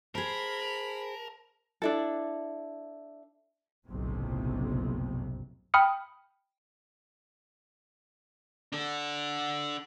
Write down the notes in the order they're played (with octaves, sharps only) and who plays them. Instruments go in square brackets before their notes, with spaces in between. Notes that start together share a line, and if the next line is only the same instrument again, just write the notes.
[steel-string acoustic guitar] G#4 C5 [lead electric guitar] A#4 [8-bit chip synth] A5 [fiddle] B5
[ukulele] D4 E4 A4
[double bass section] F#1 B1 F2 A2 C3
[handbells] G5 B5 D#6 F6 C#7
[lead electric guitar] D4 A4